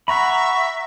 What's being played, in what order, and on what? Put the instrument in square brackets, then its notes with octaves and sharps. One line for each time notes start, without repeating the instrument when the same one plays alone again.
[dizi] E5 [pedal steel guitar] F#5 A#5 B5 [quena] C#6